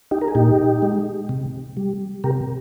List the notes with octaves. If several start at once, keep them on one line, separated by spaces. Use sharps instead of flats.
D#4 G4
A#4
G#4
A#2 D#4 G4
G#3
C3
G3
C3 G4 A#4